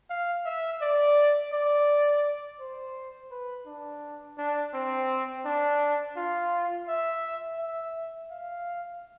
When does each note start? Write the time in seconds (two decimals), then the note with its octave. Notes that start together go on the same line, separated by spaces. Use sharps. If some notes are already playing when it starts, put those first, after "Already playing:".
0.10 F5
0.45 E5
0.82 D5
1.53 D5
2.60 C5
3.31 B4
3.67 D4
4.38 D4
4.74 C4
5.45 D4
6.17 F4
6.88 E5
7.59 E5
8.31 F5